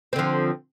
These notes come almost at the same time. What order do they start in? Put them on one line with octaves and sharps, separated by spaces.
C4 D3 F3